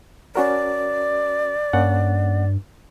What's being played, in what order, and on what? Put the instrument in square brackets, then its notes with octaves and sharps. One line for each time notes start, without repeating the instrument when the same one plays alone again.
[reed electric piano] C#4 F#4 A#4 [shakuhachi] D5
[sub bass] G2 [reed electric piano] A#3 C#4 F#5